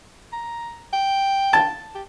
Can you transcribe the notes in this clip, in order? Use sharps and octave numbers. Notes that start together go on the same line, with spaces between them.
A#5
G5
A5
G4